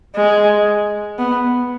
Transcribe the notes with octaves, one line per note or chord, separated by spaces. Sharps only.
G#3
B3